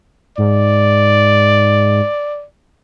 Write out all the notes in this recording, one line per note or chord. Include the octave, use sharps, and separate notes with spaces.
G#2 D5